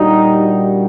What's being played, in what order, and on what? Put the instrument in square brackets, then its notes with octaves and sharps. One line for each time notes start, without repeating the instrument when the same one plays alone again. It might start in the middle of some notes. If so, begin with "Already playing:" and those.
Already playing: [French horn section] A#2 G3 D4 F#4 [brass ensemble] D#4